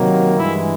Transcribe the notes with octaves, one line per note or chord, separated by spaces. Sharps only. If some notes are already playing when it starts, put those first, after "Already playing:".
Already playing: C3 D#3 F#3 A#3
G2 E3 G#3 E4